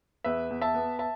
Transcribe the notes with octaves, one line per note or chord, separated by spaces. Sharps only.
E2 B4 E5
E2
E5 A5
B3
E5 A5